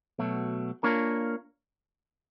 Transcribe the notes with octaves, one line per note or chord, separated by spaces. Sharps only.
B2 F#3 A3
A#3 D4 F4 A#4 C#5